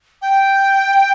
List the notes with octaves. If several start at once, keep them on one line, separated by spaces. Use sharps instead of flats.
G5